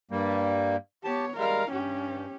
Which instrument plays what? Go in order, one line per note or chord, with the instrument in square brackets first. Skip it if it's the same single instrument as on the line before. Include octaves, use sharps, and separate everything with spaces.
[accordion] G2 G3 A#3
[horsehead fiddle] B3 C#5 [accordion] G4 A5
[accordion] G3 G#3 [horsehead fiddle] A#4 F5
[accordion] G2 [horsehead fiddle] C#4 G4